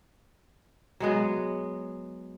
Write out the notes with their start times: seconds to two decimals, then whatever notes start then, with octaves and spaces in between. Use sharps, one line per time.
1.00 F#3 G#3 B3